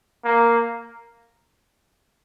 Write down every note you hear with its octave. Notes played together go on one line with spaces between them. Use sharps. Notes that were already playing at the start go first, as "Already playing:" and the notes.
A#3